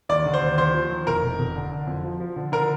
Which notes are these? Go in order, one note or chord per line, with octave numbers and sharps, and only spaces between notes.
D#2 D5 D6
D3
C5 C6
D#2
D#2 C5 C6
F3
D#2
F1 A#4 A#5
F1
F1
D3
D3
F2
F3
F3
D3
D3 A#4 A#5